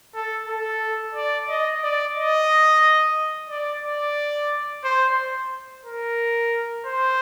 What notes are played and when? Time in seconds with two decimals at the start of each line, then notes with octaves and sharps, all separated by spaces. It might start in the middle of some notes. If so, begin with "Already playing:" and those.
0.15 A4
0.49 A4
1.15 D5
1.49 D#5
1.83 D5
2.15 D#5
3.50 D5
3.84 D5
4.84 C5
5.85 A#4
6.86 C5